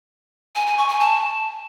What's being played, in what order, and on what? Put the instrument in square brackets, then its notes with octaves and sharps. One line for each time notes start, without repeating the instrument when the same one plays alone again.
[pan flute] G#5
G#5
C#6
G#5
A5